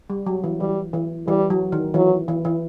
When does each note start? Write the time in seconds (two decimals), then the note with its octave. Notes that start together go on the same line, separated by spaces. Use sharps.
0.10 G3
0.26 F#3
0.44 E3
0.60 E3 G3
0.93 E3
1.27 E3 G3
1.50 F#3
1.72 D#3
1.94 E3 F#3
2.28 E3
2.45 E3